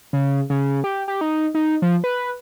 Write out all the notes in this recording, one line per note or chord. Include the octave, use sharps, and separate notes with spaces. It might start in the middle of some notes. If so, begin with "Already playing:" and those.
C#3
C#3
G4
G4
D#4
D#4
F3
B4